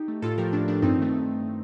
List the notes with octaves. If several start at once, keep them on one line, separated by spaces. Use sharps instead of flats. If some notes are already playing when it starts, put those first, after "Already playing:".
Already playing: D#4 G4
A3
A2 F4 A4
F3 A3 G4 A#4
A2 D4
F3 A3 D4
G2 C4 D#4
D#3 A3